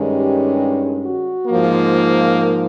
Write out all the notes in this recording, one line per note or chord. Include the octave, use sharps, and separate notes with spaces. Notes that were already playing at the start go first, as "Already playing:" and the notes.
Already playing: G2 D#3 G#3 C#4
G4
F#4
G#2 F3 A#3